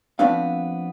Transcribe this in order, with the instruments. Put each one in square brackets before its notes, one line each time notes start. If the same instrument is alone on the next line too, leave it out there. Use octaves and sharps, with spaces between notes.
[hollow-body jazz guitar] F3 A3 B3 C4 D4 F5